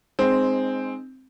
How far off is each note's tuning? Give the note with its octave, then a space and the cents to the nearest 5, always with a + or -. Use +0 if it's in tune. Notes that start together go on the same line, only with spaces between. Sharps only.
G#3 +0 C4 +0 D#4 -25